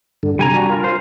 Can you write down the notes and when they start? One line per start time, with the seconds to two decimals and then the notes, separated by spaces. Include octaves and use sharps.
0.23 G2 D3
0.39 C3 G3 G#5 A#5
0.54 D4 F#4
0.69 F4 A#4
0.84 C5